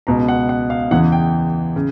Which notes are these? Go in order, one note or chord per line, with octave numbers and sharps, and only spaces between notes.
C#2 B2 A#5
F#5
F#5
F5
E2 C#3 E3 F#5
G5
C#3